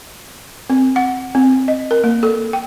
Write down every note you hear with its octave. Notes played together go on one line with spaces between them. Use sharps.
C4
F#5
C4
D#5
A#4
A#3
A4
G5